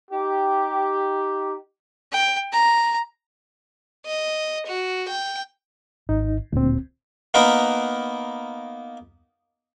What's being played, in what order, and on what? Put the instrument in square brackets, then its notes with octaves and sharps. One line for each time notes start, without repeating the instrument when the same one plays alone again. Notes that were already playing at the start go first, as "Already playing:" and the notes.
[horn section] D#4 G4
[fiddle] G5
A#5
[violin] D#5
F#4
G5
[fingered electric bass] G#1 [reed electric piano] D#4
[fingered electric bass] D1 A#2 [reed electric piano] D2 C4
[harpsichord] A#3 B3 D#4 A#4 B4